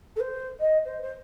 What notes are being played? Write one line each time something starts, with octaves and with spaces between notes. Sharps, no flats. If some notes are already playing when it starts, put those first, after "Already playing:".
A4
C5
D#5
C5
C5